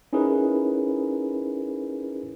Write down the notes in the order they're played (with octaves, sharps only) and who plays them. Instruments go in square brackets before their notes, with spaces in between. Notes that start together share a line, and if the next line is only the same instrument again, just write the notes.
[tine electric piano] C#4 D#4 E4 G#4 A#4 B4